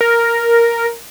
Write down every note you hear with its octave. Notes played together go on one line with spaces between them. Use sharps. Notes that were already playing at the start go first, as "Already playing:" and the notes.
A#4